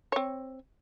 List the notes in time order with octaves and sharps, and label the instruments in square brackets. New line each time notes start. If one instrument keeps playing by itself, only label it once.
[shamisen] C4 C#5